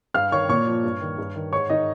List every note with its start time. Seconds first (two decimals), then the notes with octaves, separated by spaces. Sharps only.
0.14 G2 F5 F6
0.32 D#3 C#5 C#6
0.49 A#2 C#5 C#6
0.67 F3
0.84 G2
1.01 D#3
1.18 G2
1.36 D#3
1.53 G#2 C#5 C#6
1.69 D#3 D#4 D#5